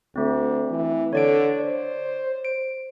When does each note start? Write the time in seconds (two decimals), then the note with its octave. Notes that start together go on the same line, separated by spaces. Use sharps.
0.16 D2 A3 C4
0.71 E3
1.13 D3 C#5 D5 D7
1.60 C5
2.45 D7